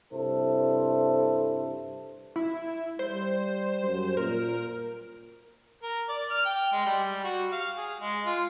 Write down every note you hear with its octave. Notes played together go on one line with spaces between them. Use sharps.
G2 C3 E4 A4 C5
E4
G3 C5
F#2
A#2 A#4
A#4
D5
F6
G5
G#3
G3
F#4
F5
G#4
G#3
F4